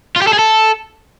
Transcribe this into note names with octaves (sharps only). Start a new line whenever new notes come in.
F4
G4
A4
G#4
A4